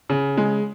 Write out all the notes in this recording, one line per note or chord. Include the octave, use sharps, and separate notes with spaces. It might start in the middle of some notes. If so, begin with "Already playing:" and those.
C#3
G#3